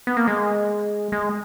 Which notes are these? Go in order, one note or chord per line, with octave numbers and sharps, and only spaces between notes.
B3
A#3
G#3
G#3